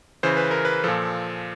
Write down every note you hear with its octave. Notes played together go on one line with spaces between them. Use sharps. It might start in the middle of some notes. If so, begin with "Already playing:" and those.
C#3 E3 C5
B4
A#4
B4
A#2 F3 A4